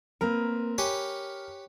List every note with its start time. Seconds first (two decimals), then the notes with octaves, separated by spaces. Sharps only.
0.21 A#3 C4 A#4 B4
0.78 G4 B4 C#5 G#5